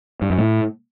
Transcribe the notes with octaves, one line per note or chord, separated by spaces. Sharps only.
G2
F#2
A2